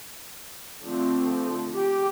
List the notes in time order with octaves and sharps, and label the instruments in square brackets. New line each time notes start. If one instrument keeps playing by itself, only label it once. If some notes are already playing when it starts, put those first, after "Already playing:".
[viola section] D3 F3 A3 C4
G4